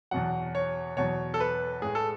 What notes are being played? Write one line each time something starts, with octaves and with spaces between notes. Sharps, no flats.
E2 B2 F#3 F#5
C#5
E2 B2 F#3 C#5
A4
B4
A2 G#3 G#4
A4